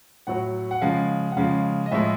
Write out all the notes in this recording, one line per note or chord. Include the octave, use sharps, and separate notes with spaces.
A2 F#3 F#5
F#5
C#3 F3 G#3 F5
F#5
C#3 F3 G#3 F5
D#5
A2 F3 G#3 E5